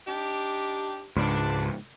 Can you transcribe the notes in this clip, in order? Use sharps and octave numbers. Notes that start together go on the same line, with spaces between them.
D4 D#4 G4
C#2 G#2 D4